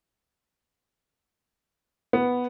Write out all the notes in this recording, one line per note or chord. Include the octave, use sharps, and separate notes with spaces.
B3